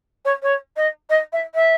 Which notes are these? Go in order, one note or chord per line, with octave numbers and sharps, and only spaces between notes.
C#5
C#5
D#5
D#5
E5
E5